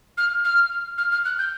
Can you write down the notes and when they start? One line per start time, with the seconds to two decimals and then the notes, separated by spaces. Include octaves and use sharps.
0.17 F6
0.44 F6
0.98 F6
1.12 F6
1.25 F#6
1.38 G6